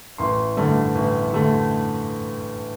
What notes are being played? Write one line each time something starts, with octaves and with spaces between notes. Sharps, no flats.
A1 C6
G2 D3 A3
A1
D3 A3